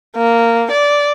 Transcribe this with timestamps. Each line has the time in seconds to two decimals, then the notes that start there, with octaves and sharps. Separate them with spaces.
0.16 A#3
0.71 D5